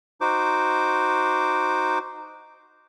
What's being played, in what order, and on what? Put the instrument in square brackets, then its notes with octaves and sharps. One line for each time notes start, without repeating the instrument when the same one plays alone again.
[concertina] D#4 F#4 C5 D6